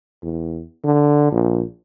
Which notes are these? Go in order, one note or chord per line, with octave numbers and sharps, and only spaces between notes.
E2
D3
A#1